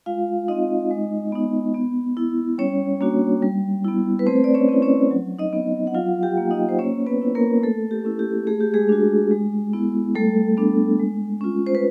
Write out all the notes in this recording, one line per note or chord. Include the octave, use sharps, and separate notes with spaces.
G#3 F4 F5
C4 D#4 F4 D#5
G#3
B3 D#4
B3
E4
G3 C#4 C#5
A#3 D4 F#4
G3
B3 E4
B4
A3 C4 C5
D5
C#4 C#5
C4 E4
C#4 C#5
F#3
D#4 D#5
B3 D#4
F#5
F#3 F4 F5
G4 G5
A#3 D#4
D#4 D#5
C5
A#3 C#4 C#5
B3 B4
C#4 E4
A#3 A#4
A3 A4
G4
C#4 E4
G4
A3 G#4
G4
G#3 G#4
D4 F#4
G#3
B3 E4
G3 A3 A4
B3 D4
G#3
C#4 F4
C5
B4